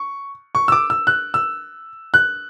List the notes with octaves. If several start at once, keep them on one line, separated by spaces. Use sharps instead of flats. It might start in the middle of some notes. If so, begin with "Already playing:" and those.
Already playing: C#6
C#6
E6
D6
E6
F#6
E6
F#6